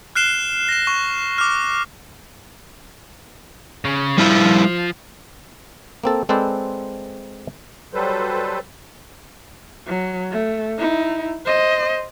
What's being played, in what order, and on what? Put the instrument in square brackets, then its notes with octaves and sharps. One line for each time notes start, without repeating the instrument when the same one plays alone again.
[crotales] F6 F#6 C7 E7 G7
A#6 E7
C#6
D6 F6
[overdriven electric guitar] C#3
[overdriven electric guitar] F3 [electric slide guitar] G3 E4 F4
[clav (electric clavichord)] A#3 C4 A4
G#3 C4 A4 B4 C5 D5
[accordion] F#3 G3 A4 B4 C5
[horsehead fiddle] F#3
A3
D#4 E4
C5 D#5